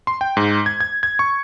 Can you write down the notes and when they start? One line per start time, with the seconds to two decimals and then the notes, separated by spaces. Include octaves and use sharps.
0.07 C6
0.21 G5
0.37 G#2
0.66 G#6
0.81 G#6
1.03 G#6
1.19 C#6